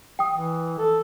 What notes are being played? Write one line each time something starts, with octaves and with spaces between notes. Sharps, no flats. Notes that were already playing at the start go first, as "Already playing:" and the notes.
G5 D#6
E3
A4